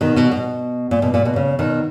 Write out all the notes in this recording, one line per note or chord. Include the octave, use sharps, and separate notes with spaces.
B2 D#3
B2
B2
A#2
B2
A#2
B2
C#3
B2 D#3